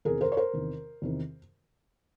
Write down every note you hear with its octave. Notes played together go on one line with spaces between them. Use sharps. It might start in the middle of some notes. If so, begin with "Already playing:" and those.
E2 C3 D#3 G#4 A#4
A#4 C5
C#5
A#4 C5
E2 C3 D#3
E2 C3 D#3